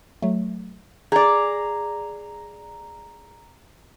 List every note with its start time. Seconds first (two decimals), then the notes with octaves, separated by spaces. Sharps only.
0.22 F#3 A3
1.12 G#4 D5 A#5